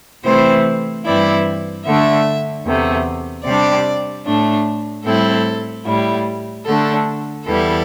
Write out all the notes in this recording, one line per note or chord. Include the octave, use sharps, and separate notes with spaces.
C3 E3 A3 C4 E4 C5
G2 E3 C4 E4 D5
D3 A3 D4 E5
E2 C3 A3
C3 G3 D4 D5
A2 A3 D4
A2 G3 C4 E4 A4
A2 G3 E4
D3 A3 D4 A4
E2 E3 G3 E4 A4